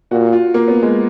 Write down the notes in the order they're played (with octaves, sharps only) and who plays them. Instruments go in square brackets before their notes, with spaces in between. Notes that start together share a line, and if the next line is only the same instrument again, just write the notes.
[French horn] A#2 [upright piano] F#4
[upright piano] F4
A#3
B3
G#3